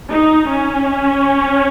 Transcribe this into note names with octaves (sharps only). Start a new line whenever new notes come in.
D#4
C#4